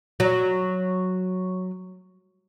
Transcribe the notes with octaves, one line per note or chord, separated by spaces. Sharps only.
F#3